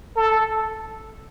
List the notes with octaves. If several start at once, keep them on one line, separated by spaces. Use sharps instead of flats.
A4